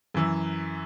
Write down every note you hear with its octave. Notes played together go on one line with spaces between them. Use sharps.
F#2 E3 E6